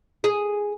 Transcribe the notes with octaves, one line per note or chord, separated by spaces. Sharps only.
G#4